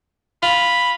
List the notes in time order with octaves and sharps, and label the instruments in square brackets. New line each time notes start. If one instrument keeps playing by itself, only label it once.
[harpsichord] F4 [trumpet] B5